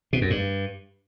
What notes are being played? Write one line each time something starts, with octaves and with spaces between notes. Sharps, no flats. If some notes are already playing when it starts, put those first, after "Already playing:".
B2
F#2
G2